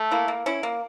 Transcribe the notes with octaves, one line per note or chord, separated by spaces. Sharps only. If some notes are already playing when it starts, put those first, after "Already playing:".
Already playing: A3
A#3 E4
A#3
C#4 E4
A#3